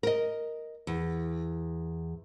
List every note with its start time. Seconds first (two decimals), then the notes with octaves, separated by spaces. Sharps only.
0.03 A#4 D#5
0.87 E2